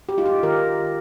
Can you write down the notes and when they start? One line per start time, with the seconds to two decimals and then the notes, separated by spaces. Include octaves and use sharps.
0.09 G4
0.17 G#3 D#4 F4
0.26 G4
0.43 D#3 A#4